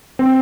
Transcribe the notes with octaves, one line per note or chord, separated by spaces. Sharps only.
C4